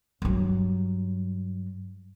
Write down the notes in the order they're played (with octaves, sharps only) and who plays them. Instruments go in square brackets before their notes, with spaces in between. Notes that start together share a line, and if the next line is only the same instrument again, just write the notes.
[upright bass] G2 F#3